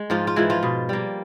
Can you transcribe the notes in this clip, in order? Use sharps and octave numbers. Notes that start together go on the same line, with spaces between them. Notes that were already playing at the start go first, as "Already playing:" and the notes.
Already playing: G#3
G#2 F3 F4
F4
E3 F3 G#3 E4
F3 F4
B2
G3 A#3